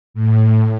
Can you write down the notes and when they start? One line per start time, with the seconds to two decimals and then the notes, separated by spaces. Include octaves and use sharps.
0.14 A2